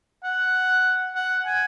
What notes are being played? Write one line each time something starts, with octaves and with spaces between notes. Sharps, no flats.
F#5
F#5
G#5